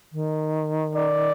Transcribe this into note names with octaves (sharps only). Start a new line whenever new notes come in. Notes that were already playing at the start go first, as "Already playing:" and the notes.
D#3
D5